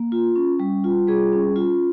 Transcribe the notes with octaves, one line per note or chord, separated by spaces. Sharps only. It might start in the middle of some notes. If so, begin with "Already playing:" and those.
Already playing: A#3
F4
C#4
G3
F4
G3 G#4
C#4
F4